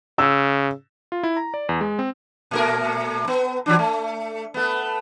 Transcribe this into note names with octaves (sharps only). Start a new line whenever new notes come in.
C#3 E6
F4
E4
A#5
D5
E2
G#3
C4
A#2 A3 A#4
B3
E3 F#3 D4
A3
A3 B3